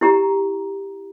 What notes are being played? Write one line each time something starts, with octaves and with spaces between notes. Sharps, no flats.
E4 G4 A#5